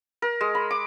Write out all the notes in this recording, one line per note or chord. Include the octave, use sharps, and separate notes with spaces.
A#4
G#3
B5
D6